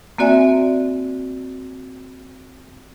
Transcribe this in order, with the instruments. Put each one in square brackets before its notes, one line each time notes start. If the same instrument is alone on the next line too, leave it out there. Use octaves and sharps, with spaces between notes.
[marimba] A#3 C4 F#4 D5 E5 G#5